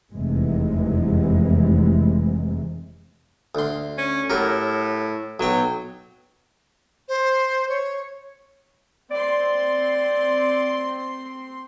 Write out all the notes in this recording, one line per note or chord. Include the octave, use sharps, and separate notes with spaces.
F1 E2 C3 E3 G#3
D2 C6
C#4
A2 F#3 G4 A#4
B1 F#3 G5
C5
C#5
C4 D5 C6